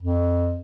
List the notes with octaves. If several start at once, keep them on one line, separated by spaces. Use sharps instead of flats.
F2